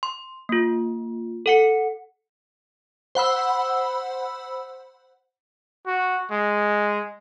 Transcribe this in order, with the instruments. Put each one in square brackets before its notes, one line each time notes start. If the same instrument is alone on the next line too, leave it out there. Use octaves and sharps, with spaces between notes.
[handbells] C6
A#3 F4
A4 F#5 C#7
[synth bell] C5 F#5 B5 E6
[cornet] F#4
G#3